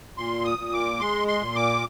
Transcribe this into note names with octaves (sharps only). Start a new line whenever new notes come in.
A#2 C6
D#6
A#2
D6
G#3 C6
C6
A#2
D6